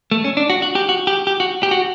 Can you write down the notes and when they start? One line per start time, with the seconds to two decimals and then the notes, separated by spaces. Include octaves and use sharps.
0.11 A3
0.24 C#4
0.37 D4
0.50 F#4
0.62 F#4
0.75 G4
0.89 F#4
1.07 G4
1.27 G4
1.40 F#4
1.63 G4
1.71 F#4